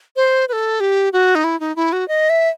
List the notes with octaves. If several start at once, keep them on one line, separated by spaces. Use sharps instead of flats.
C5
B4
A4
G4
F#4
D#4
E4
D#4
E4
F#4
D#5
E5